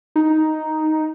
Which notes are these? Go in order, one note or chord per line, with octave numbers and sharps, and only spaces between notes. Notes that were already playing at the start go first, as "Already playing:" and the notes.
D#4